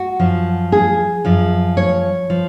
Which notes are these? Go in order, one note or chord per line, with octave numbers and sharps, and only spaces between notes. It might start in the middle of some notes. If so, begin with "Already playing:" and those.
Already playing: F#4
F#2 F3
G#4
F#2 F3
C#5
F3